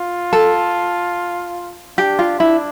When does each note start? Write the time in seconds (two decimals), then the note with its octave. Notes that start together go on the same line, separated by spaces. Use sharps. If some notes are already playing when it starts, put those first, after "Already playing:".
Already playing: F4
0.33 A4
1.98 D4 G4
2.19 F4
2.39 D4 E4